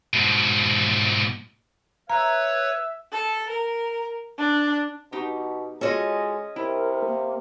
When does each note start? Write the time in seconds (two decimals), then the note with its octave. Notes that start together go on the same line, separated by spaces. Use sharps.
0.13 G#2 B2
2.10 B4 C#5 E5 A#5
3.12 A4
3.50 A#4
4.38 D4
5.12 B2 D#4 G4
5.81 G#3 C#4 F4 F#4 A4 D#5
6.56 C3 E4 A#4
7.05 A#3